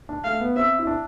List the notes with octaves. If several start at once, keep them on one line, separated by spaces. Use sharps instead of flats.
D4
A3 F5
B3
C4 E5
E4
D4